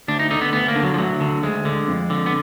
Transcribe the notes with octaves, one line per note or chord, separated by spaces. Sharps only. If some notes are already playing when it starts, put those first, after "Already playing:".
D2 D4
D#4
D3 D#4
B3
D2 B3
A#3
D3
F#3
F3
D2 F#3
D3
D2 G#3
D3
F2
D3
B3